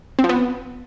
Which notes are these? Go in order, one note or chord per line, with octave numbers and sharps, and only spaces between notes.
C4
F3
B3